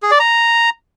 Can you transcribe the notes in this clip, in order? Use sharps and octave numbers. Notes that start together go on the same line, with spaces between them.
G#4
D5
A#5